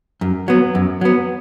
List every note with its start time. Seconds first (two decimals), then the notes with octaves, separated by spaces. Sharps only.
0.21 F#2
0.48 F#3 B3
0.75 F#2
1.01 F#3 B3